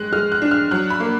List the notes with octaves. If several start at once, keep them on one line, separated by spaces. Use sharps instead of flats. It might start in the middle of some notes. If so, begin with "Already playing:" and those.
Already playing: G#3 F#6
G#3 F6
F#6
D4
F6
F#3 F#6
B5
A#3